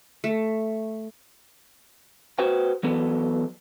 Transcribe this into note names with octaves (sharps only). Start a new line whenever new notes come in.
A3
F#4 B4 C5 G5
E3 F#3 B3 A4